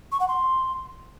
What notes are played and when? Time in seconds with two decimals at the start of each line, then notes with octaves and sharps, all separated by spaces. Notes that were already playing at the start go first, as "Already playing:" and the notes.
0.12 C#6
0.20 F#5
0.28 C6